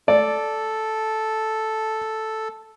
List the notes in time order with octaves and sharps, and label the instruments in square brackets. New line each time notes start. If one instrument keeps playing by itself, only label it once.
[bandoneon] A4 [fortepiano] D5